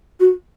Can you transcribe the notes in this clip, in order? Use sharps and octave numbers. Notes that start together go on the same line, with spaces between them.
F#4